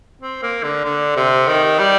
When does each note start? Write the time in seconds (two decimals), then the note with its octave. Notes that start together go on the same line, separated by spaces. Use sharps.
0.21 C4
0.42 A#3
0.63 D3
0.84 D3
1.16 C3
1.47 D#3
1.79 G3